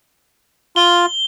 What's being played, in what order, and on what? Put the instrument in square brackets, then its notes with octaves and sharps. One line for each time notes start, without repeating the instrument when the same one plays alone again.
[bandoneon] F4 [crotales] G7